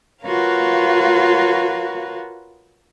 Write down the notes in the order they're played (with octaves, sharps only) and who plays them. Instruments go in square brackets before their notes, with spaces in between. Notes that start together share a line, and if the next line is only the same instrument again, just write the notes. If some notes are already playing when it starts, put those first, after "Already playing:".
[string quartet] F4 F#4 A#4 B4 C#5 F5